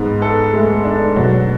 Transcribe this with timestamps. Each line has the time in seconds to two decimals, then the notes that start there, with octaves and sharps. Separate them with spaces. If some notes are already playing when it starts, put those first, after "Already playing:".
Already playing: G#2 B3
0.22 A4
0.53 G#3 A3
0.84 D4
1.16 B2 F#3